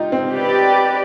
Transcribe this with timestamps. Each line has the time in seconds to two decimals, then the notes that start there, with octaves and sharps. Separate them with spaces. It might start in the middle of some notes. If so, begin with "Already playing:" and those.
Already playing: D#4 F4 G4
0.12 C4
0.32 G4 B4 D5